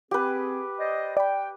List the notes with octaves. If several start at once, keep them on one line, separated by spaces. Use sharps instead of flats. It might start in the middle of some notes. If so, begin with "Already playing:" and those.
C4 G4 G#4 B4
C5 D5 D#5
D5 G5 B5